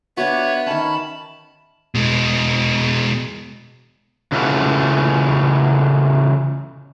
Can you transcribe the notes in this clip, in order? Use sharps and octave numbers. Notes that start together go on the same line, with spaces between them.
B3 D4 F#4 C#5 E5
D#3 C#4 A5 B5
B2 G#3
C#3 E3 A3 F4 F#4